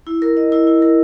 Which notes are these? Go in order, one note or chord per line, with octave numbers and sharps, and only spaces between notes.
E4
A#4
D#5
E4
E4
A#4